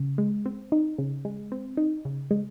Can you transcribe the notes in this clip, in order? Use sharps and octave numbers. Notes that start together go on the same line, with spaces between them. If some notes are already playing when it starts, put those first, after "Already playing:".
Already playing: C#3
G#3
C4
D#4
C#3
G#3
C4
D#4
C#3
G#3